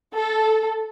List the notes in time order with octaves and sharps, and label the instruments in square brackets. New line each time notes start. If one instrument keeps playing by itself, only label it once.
[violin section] A4